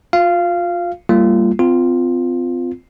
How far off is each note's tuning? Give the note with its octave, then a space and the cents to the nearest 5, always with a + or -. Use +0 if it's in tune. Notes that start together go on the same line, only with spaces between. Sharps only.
F4 +25 F5 -15
G3 +0 A#3 -30 F4 -25
C4 -30 F4 +0